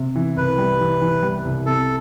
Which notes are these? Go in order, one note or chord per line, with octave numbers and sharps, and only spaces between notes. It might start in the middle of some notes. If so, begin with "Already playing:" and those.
Already playing: C3
E3
C2 B4
G3
E3
E3
G3
C2
C3 A4